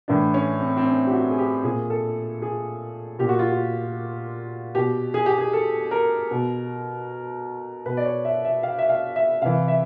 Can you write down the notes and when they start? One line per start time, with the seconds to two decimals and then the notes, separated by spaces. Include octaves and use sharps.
0.08 A2 E3 D4
0.34 C#4
0.60 C4
0.77 C4
0.86 C#4
1.07 G4
1.12 F#4
1.31 G#4
1.39 G4
1.63 A#2 G#4
1.90 A4
2.42 G#4
3.19 A#2 G4
3.29 F#4
3.39 F4
3.49 F#4
4.75 B2 G4
5.14 G#4
5.26 G4
5.38 G#4
5.53 A4
5.91 A#4
6.31 B2
7.85 B2 B4
7.97 D5
8.05 C#5
8.25 E5
8.45 E5
8.63 F5
8.78 E5
8.89 F5
9.16 E5
9.41 C3 E3 F5
9.68 E5